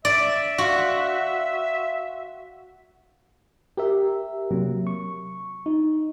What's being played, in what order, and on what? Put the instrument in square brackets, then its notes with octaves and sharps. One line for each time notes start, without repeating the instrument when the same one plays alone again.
[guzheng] D5 [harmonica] E5
[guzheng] F#4 [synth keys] F5 C6
[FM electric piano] G4 A#4 E5
C3 F#3 A#3
C#6
D#4